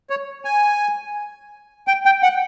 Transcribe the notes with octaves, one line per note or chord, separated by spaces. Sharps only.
C#5
G#5
G5
G5
F#5